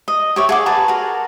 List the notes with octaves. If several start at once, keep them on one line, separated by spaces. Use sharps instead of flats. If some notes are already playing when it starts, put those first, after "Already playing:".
D#5
G4 C#5 E5
G#4 F#5 D6
G#4 B4 A5 A#5
F#4 A#4